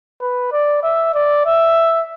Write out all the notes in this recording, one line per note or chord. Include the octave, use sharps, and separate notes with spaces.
B4
D5
E5
D5
E5